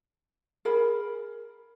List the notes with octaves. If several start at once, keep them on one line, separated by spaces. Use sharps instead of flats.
G#4 A#4 B5